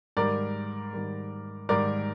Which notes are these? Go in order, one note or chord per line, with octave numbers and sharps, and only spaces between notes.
G#2 D#3 G3 A#4 D5
G#2 D#3 G3
G#2 D#3 G3 A#4 D5